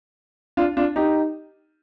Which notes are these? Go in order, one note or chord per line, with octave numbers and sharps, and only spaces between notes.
D4 F4
D4 F4
D#4 G4